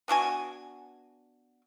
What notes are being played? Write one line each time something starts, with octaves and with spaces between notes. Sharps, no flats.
B3 D4 F#4 G#5